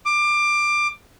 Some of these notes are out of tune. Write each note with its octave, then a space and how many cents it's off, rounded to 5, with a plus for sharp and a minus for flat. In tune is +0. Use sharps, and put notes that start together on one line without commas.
D6 +20